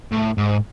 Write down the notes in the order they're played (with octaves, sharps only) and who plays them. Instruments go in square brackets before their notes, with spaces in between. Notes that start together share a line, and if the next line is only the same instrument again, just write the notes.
[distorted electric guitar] A2
G#2